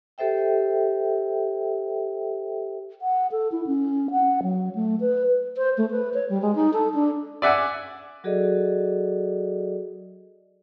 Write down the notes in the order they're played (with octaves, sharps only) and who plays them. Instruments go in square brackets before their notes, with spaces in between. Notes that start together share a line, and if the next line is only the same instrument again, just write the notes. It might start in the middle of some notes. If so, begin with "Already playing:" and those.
[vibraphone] G4 A4 C5 E5 G5
[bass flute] F#5
A4
E4
C#4
F#5
F#3
A3
B4
C5
A3
B4
C#5
G3
G#3
D#4
A4
D4
[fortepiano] D5 E5 F#5 G#5
[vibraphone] F#3 F#4 G#4 A4 D5 D#5